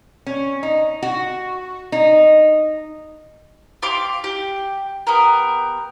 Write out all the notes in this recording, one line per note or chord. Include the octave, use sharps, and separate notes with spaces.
C#4
D#4
F#4
D#4
G4 F5 C6 D6
G4
B3 G4 A#4